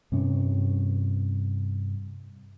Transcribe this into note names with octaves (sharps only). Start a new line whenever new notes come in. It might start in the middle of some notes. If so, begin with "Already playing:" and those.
G2 C3 C#4